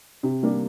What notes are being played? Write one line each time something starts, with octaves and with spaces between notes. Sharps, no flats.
C3
G3 A#3 D4